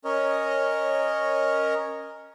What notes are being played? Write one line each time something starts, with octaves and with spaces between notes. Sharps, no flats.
C#4 A#4 C#5 D#5